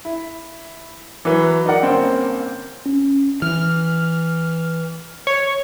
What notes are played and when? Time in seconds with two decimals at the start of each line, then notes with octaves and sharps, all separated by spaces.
0.05 E4
1.25 E3 F#3 B4
1.65 D#4 A#4 D5 F#5
1.82 G1 A#3 C4 C#4 G5
2.86 C#4
3.42 E3 F6
5.27 C#5